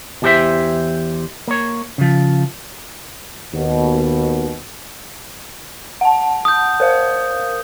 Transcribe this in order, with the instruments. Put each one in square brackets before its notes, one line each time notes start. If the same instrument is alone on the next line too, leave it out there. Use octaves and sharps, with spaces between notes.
[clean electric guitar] E2 E3 G4 A4 C5 E5
A#3 C#5
C#3 F3
[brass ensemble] D#2 B2
[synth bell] F#5 A5
[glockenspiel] D#6 G6
[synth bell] A#4 C5 F5